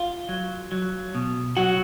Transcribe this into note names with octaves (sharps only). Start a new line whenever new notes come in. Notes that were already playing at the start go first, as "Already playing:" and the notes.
Already playing: F4
F#3
F#3
B2
F#3 F#4